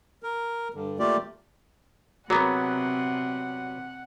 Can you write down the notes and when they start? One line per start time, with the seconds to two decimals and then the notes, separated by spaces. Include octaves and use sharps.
0.23 A#4
0.74 G2 D3
0.99 A3 A#3 F4 G4 D5
2.30 C3 F#3 B3 G#4 A#4 F#5 A#5